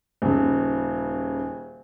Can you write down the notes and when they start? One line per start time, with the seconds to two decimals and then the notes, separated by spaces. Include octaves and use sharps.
0.22 D#1 C#3